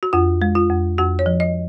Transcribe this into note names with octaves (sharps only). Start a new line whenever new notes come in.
F#4
F2 F4
G#3
F4
F2
F2 F#4
C#5
F3
D#5